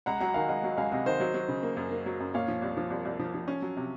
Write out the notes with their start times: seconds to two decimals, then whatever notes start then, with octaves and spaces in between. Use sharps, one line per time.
0.06 C#2 F#5 A#5
0.21 F#3 F#5 A#5
0.34 D#3 F5 G#5
0.48 C#2 D#5 F#5
0.64 F#3
0.77 C#2 F5 G#5
0.92 C3 D#5 F#5
1.06 D#3 C5 D#5
1.20 F#3
1.34 F#3
1.48 C#3
1.63 A#3
1.77 F#2
1.91 A#3
2.06 F#3
2.20 F#2
2.34 A#2 C#5 F5
2.48 F3
2.62 C2
2.77 F3
2.91 C2
3.05 C2
3.19 F3
3.34 F3
3.48 C#4
3.62 F#3
3.77 C3